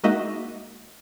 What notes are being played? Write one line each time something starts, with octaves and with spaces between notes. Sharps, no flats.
G#3 A#3 D#4 F#4 D#5 E5